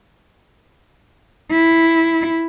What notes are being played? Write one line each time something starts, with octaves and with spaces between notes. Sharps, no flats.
E4